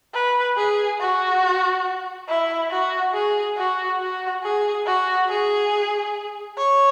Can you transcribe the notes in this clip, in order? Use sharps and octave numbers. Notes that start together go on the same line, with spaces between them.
B4
G#4
F#4
E4
F#4
G#4
F#4
F#4
G#4
F#4
G#4
C#5